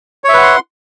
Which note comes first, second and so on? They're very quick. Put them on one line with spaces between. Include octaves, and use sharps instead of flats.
C#5 E5 B4 F#5 C6